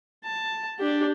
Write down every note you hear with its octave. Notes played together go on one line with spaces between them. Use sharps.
A5
D4 G4